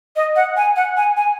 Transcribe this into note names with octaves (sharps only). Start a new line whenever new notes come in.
D#5
F#5
G#5
F#5
G#5
G#5